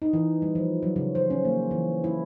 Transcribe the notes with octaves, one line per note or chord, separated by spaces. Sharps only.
D#4
E3
G3
F3
F#3
C#3
C5
C#4
A#3
E3
E4